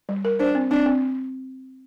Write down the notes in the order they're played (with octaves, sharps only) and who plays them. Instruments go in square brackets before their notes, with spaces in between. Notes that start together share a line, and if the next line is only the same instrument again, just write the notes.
[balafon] G3
A#4
[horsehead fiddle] D4 [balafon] C5
[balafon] C4
[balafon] C4 [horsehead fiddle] D4
[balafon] C4